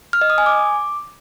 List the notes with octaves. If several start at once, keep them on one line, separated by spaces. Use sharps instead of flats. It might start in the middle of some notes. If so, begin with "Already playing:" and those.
F6
D#5
D#6
G#5
D6